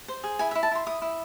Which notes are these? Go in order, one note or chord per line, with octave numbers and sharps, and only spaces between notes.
C5
G#4
E4 G#5
E5
E4
A5
E4 C6
E4 D#6
E4